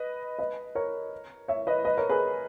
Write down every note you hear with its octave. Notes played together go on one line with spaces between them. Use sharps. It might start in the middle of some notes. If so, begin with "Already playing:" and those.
Already playing: B4 D#5
B4 D#5
A#4 C#5
C#5 E5
B4 D#5
B4 D#5
A#4 C#5
G#4 B4